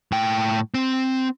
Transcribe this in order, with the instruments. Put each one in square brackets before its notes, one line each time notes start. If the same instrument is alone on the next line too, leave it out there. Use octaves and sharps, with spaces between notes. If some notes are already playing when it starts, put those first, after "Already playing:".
[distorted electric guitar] A2 G5
C4